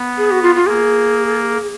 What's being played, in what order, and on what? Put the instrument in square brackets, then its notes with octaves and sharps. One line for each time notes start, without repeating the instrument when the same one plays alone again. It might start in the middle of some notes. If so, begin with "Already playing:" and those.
Already playing: [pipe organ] B3
[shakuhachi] G#4
F#4
F4
F4
[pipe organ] A#3 [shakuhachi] G#4